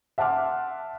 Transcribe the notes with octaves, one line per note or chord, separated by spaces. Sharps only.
E5 F#5 A5 C6 D6 F6